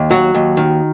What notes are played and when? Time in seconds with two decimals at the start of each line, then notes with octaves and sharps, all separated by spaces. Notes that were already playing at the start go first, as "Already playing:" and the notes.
Already playing: D#2
0.11 F#3 F#4
0.34 D#2
0.57 D#3